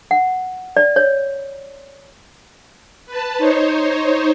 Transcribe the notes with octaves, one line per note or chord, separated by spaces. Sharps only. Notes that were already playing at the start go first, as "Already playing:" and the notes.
F#5
D5
C#5
B4 A5
D#4 C5 C#5